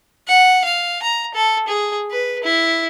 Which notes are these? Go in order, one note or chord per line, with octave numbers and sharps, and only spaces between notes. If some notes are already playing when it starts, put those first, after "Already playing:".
F#5
F5
A#5
A4
G#4
B4
E4